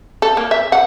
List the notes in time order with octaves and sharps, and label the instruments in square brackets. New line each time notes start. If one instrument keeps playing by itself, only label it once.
[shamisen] A4
A#3
E5
F#5